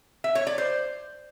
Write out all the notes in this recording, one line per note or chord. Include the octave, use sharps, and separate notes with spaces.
E5
C#5
D5
C5